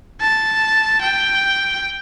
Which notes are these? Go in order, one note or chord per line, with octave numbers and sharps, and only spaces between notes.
A5
G5